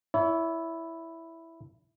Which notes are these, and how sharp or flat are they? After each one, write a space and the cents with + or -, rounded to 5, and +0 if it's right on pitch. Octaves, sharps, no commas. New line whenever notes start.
E4 +0 C#5 +40